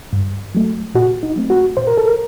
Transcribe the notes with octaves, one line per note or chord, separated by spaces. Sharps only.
G2
F#3 A3
A#2 F#4
D#4
F#3 A3 C4
F#4
A#2 C5
A#4
A4
A#4